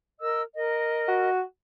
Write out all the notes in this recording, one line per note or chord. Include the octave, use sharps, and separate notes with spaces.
A#4 D#5 E6
A#4 D#5
F#4